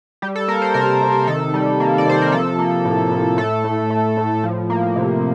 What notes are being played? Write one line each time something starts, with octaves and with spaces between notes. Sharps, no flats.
G3 G4
A4
A#3 A#4
C5
C3 A#4
C3
D#3 A4
G3
A#3
D5
C3 C5
A#4
F3 A4
A#3
A2
A2
A3 A4
A2
A3
A2
F3
A#3
C3